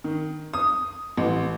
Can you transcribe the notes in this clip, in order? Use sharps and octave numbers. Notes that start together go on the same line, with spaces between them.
D#3
D#6
A1